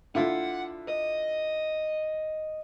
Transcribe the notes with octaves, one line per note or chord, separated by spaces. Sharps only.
D3 E4 F4 F#5
D#5